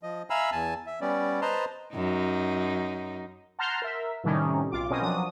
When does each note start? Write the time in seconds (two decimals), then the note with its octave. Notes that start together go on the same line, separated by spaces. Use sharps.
0.03 F3 D#5
0.30 E5 F5 G#5 A#5 B5 E6
0.52 E2 G#5 A5
0.87 E5
1.01 G3 B3 C#4 D5
1.42 B4 C5 D#5 A5 A#5 C6
1.95 F#2 D#4
3.59 F#5 A5 A#5 C6 F6 G6
3.82 A#4 E5
4.24 A2 C3 D#3 G3 C#4 D#4
4.72 B1 F4 D6
4.90 B2 C4 C#4 A#4 D#5 D#6
5.02 F3 F#3 D4 D#6